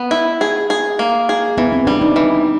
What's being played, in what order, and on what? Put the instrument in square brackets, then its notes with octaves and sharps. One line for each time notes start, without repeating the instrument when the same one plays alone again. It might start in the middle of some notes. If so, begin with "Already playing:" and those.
Already playing: [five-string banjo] B3
E4
G#4
G#4
A#3
G#4
[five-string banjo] E3 [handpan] B3
[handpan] C4
[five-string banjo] G3 [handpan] D4
[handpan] D#4
[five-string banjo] E3